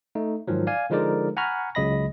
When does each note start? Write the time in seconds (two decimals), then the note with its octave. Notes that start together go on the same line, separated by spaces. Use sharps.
0.15 A3 D#4
0.48 G#2 D#3 F3 F#3
0.67 D5 F5 G#5
0.90 D3 F3 G#3 D#4 A#4 D5
1.37 F#5 G#5 A#5 B5 C#6 F6
1.75 C#2 C#3 F#3 D#5 B5 A#6